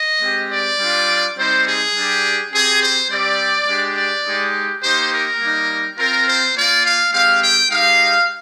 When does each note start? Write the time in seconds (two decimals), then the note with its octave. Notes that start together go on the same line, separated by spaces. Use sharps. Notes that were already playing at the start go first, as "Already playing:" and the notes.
Already playing: D#5
0.21 G#3 C4 G4
0.51 D5
0.79 G3 D4 F4
1.36 G3 C4 D#4 C5
1.65 G#4
1.95 G3 D4 G4
2.52 C4 G4 G#4
2.80 C5
3.10 G3 C4 G4 D5
3.67 G#3 D4 G4
3.96 D5
4.25 G#3 D#4 G4
4.82 A#3 D#4 G4 C5
5.11 A#4
5.40 G3 A#3 D#4
5.97 C4 F4 A#4
6.26 C5
6.55 A#3 F4 D5
6.84 F5
7.12 G#3 C4 G4 F5
7.42 G5
7.70 G#3 D#4 G4 F5